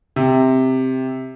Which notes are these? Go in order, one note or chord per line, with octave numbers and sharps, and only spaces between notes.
C3